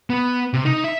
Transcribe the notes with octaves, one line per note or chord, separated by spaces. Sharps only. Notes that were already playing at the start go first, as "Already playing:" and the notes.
B3
C3
D#4
E5